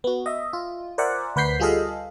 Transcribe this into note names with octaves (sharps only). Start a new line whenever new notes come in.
B3 F#4
D#5 E5
F4
A#4 C5 D5 E5 F#5 G#5
D2 B4 F#5 G6 B6 C7
G3 F4 G#4 A4 D#5 F5